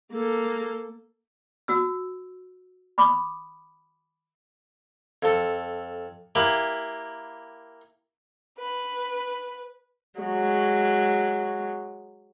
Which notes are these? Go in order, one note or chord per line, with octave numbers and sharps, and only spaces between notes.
A#3 A4
F#4 E6
B5 D6 D#6
F2 A4
A#3 E4 G4 B4
B4
F#3 G#3